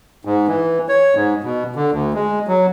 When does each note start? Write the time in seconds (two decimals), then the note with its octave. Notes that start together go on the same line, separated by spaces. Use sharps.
0.25 G#2
0.48 E3
0.89 C#5
1.15 G#2
1.44 B2
1.76 D3
1.92 D2
2.14 G#3
2.47 F#3